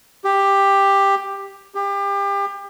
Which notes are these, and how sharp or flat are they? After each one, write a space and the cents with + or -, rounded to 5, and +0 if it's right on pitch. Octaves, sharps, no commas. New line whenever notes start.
G4 +10
G4 +30